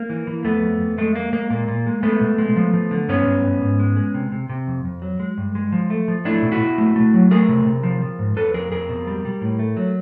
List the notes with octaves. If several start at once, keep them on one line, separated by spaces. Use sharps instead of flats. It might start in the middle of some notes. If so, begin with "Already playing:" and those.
Already playing: A#3
E3
E3
F2 A3 B3
F2
F2
G#3 A3
G#3 A#3
G#3 A#3
A#2 A#3
A#2
G#3
G#3 A3 B3
B2
G#3
F3
F3
D3
G2 B3 C#4
G2
G2
G#2
G#3
G#3
C3
C3
C3
F2
F2
F#3
G#3
G2
G#3
F3
A3
F3
A3 D4 E4
B2
E4 F#4
B2
A3
A3
F#3
A3 G#4 A#4
C3
C3
F3
F3
G#2
F2 A4 B4
F2 G#4 A#4
F2 G#4 A#4
B2
G3
G3
A2
A3
F#3